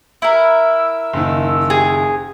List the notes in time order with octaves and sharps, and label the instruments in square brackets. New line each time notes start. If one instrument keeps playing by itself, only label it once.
[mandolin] E4 A#4 [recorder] E6
[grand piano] F#1 D#3
[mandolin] G#4